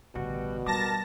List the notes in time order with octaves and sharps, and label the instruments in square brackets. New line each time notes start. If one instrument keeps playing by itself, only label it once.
[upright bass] A1 D3 [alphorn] B2 [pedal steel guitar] G3 F#4
[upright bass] G3 [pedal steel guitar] A#4 D6 [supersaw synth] A5 A#6